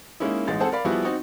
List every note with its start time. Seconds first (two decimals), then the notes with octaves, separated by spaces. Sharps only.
0.20 G#3 A#3 C#4 D#4 E4
0.48 A1 G#3 D#4 A6
0.60 C4 G#4 A4 C5 F#5 A5
0.72 A#4 D5 F5 B5
0.85 F3 G3 B3 E4 F#4 G#4
1.04 C4 D#4 F#4